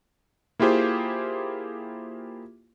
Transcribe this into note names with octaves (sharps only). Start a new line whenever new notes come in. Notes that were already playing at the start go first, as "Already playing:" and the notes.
A#3 E4 F4 G4 G#4 C5